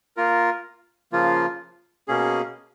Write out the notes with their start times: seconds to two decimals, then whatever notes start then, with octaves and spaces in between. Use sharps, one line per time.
0.17 A#3 F4 A#4
1.12 C#3 F3 A#3 F4
2.08 B2 A#3 C#4 G#4